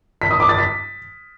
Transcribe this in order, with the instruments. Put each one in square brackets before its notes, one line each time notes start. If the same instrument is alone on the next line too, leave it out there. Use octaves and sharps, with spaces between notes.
[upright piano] B6
D#6
D6
A6
B6